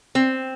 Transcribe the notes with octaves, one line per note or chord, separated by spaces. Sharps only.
C4